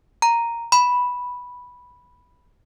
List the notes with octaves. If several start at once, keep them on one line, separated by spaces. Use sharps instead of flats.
A#5
B5